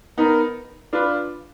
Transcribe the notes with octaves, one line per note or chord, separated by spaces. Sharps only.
B3 D#4 A#4
D4 F4 B4